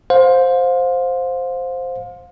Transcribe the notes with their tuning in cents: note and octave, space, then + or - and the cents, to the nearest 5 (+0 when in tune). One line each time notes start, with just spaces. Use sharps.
C5 +0 F5 +30